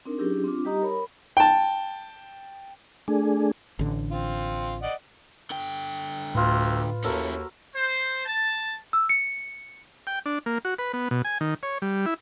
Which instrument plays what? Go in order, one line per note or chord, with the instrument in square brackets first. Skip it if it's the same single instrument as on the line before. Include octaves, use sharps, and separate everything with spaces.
[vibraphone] C4 D4 D#4 A#4
F#3 C#4 D4 E4 G4 G#4
C4 D4 F4 D6
G3 D#4 G4 D#5 A#5 D#6
A#4 C#5 B5
[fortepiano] G5 A5
[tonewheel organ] A3 D4 G#4
[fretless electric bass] A1 D3
[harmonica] C4 F4
D5 D#5 F#5
[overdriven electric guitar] D3 G5
[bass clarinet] D2 [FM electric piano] A2 [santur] F4 B4
[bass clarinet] D#2 [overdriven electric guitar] C#4 E4 [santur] F#4 A4 A#4
[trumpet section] C5
A5
[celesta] E6
C#7
[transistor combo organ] G5
D4
A#3
F#4
B4
B3
B2
G#5
D#3
C#5
G3
E4